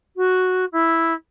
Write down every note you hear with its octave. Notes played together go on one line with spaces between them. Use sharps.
F#4
E4